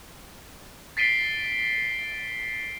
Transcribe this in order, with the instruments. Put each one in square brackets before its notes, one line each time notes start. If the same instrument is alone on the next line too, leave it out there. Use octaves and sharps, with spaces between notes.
[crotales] A6 B6 C7 D7 D#7 G7